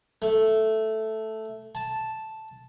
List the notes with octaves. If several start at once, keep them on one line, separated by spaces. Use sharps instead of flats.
A3
A5